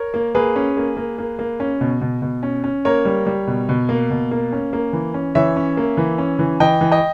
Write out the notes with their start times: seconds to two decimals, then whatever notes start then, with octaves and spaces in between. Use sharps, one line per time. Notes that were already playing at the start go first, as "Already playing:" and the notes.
Already playing: A#4 C#5
0.14 A#3
0.35 A#3 G#4 B4
0.56 C#4
0.77 A#3
0.97 A#3
1.18 A#3
1.39 A#3
1.60 C#4
1.81 B2
2.01 B2
2.22 B2
2.43 C#4
2.64 C#4
2.85 A#3 A#4 C#5
3.05 G3
3.26 G3
3.47 B2
3.69 B2
3.89 A#3
4.10 B2
4.31 A#3
4.52 C#4
4.73 A#3
4.93 E3
5.14 C#4
5.35 E3 C#5 E5
5.56 C#4
5.77 A#3
5.97 E3
6.18 C#4
6.39 E3
6.60 E3 D#5 G5
6.81 E3
6.91 D#5 G5